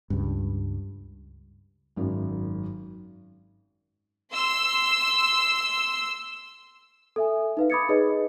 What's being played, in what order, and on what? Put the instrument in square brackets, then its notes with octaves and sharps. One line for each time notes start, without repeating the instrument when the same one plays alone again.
[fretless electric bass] C#2 G2
[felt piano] G#1 F#2
[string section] C6 E6
[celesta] A4 E5 G#5
D#4 B4 F5
B5 D6 D#6 G#6 A6 C#7
D#4 G#4 B4 C#5 D#5